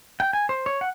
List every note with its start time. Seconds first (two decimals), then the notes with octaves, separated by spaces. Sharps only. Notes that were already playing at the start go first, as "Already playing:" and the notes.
0.20 G5
0.33 G#5
0.49 C5
0.66 C#5
0.81 F#5